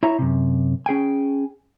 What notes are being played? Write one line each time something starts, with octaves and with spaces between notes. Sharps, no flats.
E4 C#5 E5 A#5
F#2 C3
C#4 G#4 G5 G#5